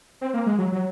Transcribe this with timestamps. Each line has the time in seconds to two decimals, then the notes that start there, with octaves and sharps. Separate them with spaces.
0.21 C4
0.34 A#3
0.46 G#3
0.58 F#3
0.72 F#3